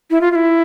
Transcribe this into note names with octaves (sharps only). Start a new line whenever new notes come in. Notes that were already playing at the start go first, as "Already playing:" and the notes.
E4
F4
F4
E4